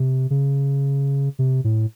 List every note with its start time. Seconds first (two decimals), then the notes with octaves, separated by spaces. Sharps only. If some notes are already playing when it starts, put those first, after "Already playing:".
Already playing: C3
0.30 C#3
1.39 C3
1.64 A2